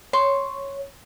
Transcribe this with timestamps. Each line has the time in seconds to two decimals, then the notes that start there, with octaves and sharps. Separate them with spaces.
0.13 C#5 C6 C#6